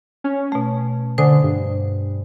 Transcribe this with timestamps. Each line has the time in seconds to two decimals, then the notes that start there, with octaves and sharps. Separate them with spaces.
0.24 C#4
0.52 B2 A3
1.18 D3 C5 G#5 D#6
1.43 G2